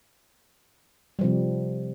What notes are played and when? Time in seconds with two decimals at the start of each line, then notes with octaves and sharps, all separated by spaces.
1.19 G3
1.21 F3
1.24 C3